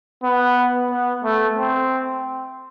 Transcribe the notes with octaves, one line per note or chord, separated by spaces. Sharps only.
B3
B3
A3
C4